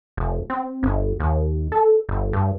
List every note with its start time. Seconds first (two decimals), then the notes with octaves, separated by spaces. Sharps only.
0.17 F1
0.50 C4
0.83 G1
1.20 D#2
1.72 A4
2.09 G1
2.33 G2